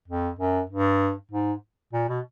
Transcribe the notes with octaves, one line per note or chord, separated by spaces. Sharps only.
F2
F#2
G2
G#2
A#2
B2